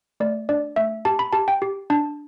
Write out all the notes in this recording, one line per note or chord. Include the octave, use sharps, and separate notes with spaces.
A3 D5
D4 D5
A3 E5
G4 A5
B5
G4 A5
G5
G4
D4 A5